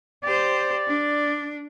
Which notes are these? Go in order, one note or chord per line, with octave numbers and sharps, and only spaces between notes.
G4 C5 D5
D4